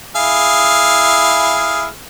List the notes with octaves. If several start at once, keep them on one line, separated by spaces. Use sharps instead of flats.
E4 G#4 F5